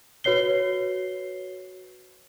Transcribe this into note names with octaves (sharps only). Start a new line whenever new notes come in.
F#4 B4 C#5 C7 G7